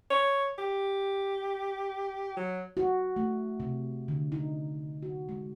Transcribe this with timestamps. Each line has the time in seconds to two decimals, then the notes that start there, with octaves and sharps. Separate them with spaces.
0.11 C#5
0.58 G4
2.37 F#3
2.77 F#4
3.16 A3
3.60 C3
4.08 D3
4.32 D#4
5.03 F#4
5.29 G#3